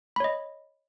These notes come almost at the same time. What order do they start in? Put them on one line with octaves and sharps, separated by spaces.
B5 C#5 D#5